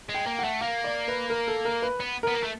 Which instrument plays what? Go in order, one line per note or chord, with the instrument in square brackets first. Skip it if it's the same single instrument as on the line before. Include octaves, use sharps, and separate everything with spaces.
[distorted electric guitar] G#3
[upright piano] G5
[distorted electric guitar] A#3
[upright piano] F#5
[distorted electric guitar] A3
[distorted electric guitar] A#3 [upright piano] F5
[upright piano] D5
B4
A#4
A4
A#4
B4
[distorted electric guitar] B3
[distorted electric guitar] B3 [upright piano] A#4
[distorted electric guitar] A#3
A3